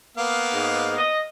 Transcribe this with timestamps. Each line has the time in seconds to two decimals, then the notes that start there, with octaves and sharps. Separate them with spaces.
0.17 A#3 B3 F5
0.53 G#2
0.97 D#5